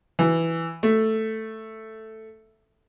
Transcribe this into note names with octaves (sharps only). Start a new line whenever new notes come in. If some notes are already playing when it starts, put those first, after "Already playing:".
E3
A3